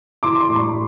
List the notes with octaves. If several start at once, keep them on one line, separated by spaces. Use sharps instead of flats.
E3 C6 D6
C6 D6
A2
B5 C#6
A2